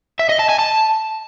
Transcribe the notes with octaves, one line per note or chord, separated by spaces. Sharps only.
E5
D#5
A5
G#5
A5